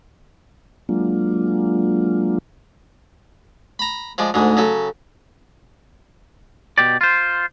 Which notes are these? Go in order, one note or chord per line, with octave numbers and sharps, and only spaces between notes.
F#3 G#3 A#3 D4 F4
A#5 B5
F3 G#3 D5
D2 G#2 G#3
C#3 F#3 A4
B2 G4 D5
F4 C5